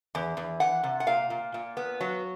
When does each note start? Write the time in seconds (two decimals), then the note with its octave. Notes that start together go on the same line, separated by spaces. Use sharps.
0.15 E2
0.37 E2
0.60 E3 F#5
0.83 C3
1.00 F#5
1.07 A#2 F5
1.30 A#2
1.54 A#2
1.77 B3
2.01 F#3